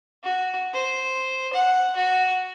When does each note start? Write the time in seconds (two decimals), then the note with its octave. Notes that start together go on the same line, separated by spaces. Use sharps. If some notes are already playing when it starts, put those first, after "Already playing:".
0.23 F#4
0.73 C5
1.53 F#5
1.96 F#4